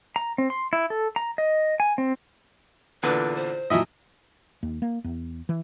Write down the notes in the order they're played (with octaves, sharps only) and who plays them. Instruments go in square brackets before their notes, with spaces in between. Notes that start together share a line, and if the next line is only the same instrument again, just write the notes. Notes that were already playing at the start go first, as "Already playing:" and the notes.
[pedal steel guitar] A#5
C4
C6
E4
A4
A#5
D#5
G#5
C4
[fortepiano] E2 A#2 D3 [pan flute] B4
[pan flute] C5
[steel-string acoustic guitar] A#2 F#3 [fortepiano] F3 E4 D#5
[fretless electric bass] D#2
A#3
E2
E3